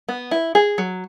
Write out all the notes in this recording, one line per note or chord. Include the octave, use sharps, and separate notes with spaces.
B3
E4
G#4
F#3